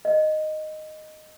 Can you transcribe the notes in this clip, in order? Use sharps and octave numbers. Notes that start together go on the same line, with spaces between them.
D#5